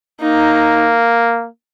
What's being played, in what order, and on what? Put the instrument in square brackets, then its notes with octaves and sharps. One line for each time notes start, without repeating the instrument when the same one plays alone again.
[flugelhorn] A#3 [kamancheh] D#4